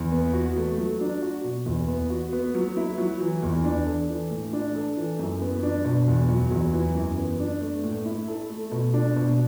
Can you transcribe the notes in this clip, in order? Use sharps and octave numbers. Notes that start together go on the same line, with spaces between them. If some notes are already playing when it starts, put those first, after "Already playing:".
Already playing: E2
B3
F#4
A3
F#3
D4
F#4
B2
E2
B3
F#4
B3
F#3
E4
F#3
E3
E2
D4
A4
E3
A2
D4
A4
E3
F#2
B3
D4
B2
E2
F#3
E2
E3
F#2
B3
D4
A3
A2
E4
A4
A3
B2
D4
B2